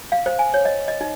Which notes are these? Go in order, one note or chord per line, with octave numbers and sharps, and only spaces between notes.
F5
C5
G#5
C#5
D#5
D#5
D#4